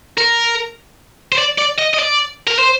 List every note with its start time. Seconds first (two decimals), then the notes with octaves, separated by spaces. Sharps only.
0.18 A#4
1.32 C5
1.38 D5
1.58 D5
1.78 D#5
1.94 D#5
1.99 D5
2.47 A#4
2.59 C5